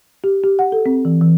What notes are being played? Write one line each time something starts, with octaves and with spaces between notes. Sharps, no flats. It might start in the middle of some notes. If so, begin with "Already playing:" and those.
G4
G4
F#5
A4
C4
E3
E3